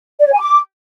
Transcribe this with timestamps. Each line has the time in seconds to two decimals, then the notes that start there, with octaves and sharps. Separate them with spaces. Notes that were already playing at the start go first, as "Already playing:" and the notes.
0.19 D5
0.26 C#5
0.34 G#5
0.41 D6